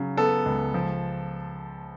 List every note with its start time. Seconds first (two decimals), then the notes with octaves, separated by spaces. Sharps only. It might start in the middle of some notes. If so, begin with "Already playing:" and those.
Already playing: C#3 F#3
0.17 B3 A4
0.46 C#2
0.74 F3